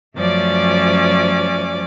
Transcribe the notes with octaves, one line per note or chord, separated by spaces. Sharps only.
F#2 F3 A3 C#4 D5 D6